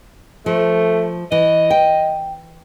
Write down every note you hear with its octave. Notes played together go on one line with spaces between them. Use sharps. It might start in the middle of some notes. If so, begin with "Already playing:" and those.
F3 A3
E3 D#5
G5